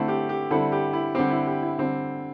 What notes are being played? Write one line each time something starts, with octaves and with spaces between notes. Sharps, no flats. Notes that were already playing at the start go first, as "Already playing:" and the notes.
Already playing: D3 A3 C4 E4 A4
G4
G4
D3 G3 C4 E4 A4
G4
E4
D3 G3 C4 G4
E4
G4
E4
D3 G3 C4